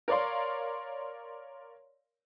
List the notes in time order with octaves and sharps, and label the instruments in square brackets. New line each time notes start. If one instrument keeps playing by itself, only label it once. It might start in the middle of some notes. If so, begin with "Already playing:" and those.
[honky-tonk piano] A#4 C#5 D5 F5 C6